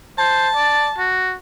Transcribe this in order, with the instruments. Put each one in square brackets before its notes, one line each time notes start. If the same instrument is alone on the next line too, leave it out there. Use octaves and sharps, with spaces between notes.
[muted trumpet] C5 [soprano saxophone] A5
[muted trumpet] D5
F#4